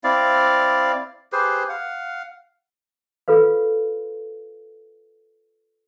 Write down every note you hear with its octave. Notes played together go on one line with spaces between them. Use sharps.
C4 E4 D5 F5
G4 G#4 B4 C5
F5 F#5
F4 A4 B4 F5